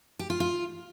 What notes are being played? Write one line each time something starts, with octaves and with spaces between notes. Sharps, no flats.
G4
F4
F4